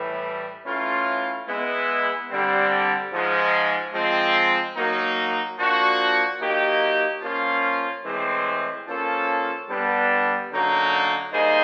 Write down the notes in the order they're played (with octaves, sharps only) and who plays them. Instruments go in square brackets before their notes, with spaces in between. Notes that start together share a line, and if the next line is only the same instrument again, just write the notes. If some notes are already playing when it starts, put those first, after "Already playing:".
Already playing: [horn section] A2 E3 G3
E3 A3 C#4 F4
G#3 B3 E4
D3 G3 C4
G#2 F3 G#3
F3 G#3 C4
F#3 A#3 D#4
F3 A#3 D4 F#4
F#3 A#3 D#4 G4
F3 A#3 C#4 F4
A2 E3 G#3 C4
F3 A#3 C#4 F4 A4
D3 G3 B3 D4
F#2 D3 F#3 A#3 D#4
G3 A#3 D#4 G#4 C5